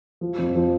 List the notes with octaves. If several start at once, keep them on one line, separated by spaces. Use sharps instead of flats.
F3
F2
F3